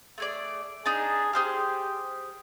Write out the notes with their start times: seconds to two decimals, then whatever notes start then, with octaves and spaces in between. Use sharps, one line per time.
0.18 A3 G#4 D5
0.85 D4 D#4 G#4
1.33 G4 G#4 C5 F6